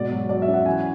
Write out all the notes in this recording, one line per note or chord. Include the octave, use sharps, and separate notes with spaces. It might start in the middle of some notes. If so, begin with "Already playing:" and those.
Already playing: G#2 B2 D5
F#3
F#3 D5
E5
C#4
F#5
E3 G#5